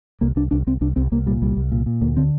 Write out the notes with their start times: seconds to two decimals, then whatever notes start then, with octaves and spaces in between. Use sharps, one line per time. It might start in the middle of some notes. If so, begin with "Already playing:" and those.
0.21 C2 A#3
0.36 C2 D4
0.51 C2 D4
0.67 C2 C4
0.81 C2 D4
0.96 C2 C4
1.12 C2 A#3
1.26 A#2 G3
1.42 C2 G3
1.57 C2
1.71 A#2
1.86 A#2
2.01 D2 A#3
2.17 D3 C4